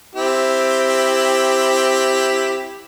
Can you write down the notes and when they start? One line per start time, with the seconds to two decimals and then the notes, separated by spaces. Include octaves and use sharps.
0.15 C4 E4 G4